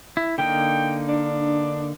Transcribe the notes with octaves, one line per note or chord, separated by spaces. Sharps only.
E4
D3 A#3 D#4 G5
D4